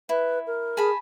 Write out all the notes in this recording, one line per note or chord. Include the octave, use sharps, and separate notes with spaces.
E4 B4
A#4
G#4 G#5 A5 B5